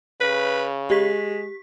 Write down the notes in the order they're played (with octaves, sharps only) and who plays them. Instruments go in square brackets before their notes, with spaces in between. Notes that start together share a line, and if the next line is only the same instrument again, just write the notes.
[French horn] C#3 [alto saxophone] B4
[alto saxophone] G#3 [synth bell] G4 B6